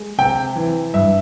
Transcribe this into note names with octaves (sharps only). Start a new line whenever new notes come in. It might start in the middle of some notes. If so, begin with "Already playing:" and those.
Already playing: G#3
C3 G5
E3
G2 E5